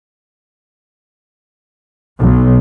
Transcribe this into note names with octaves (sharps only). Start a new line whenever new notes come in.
B1